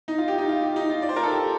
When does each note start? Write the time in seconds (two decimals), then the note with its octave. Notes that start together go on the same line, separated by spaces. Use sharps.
0.08 D#4
0.18 F4
0.28 G4
0.38 D#4
0.49 F4
0.63 G4
0.76 D#4
0.90 F4
1.02 D5
1.09 C5
1.16 A#4
1.23 A4
1.31 G4